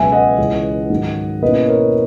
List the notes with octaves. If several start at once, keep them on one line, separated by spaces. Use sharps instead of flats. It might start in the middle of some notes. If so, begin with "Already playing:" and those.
Already playing: C#2 B2 F#3 B3 E5 G#5
D#5 F#5
C#2 C#3 E3
G#2 D#3 F#3
B2 A#3 C#4 E4 B4 D#5
A#4 C#5